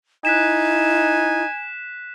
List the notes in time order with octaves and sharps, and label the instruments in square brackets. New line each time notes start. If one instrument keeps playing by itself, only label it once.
[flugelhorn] D#4 [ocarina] E4 [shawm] G#5 [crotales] F#6 B6 E7